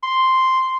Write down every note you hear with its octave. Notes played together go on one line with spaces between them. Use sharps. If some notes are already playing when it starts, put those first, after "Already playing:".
C6